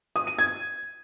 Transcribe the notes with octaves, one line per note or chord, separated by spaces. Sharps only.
D#6
D#7
G#6